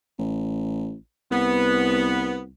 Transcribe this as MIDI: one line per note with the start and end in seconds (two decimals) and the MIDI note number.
0.19 0.95 33
1.31 2.50 36
1.31 2.40 59